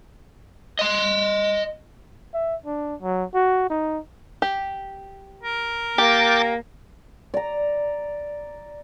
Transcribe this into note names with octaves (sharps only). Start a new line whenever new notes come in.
D#5 C6
E5
D4
F#3
F#4
D#4
G4
A#4
A#3 G4 G5 D6 A6
D5 A#5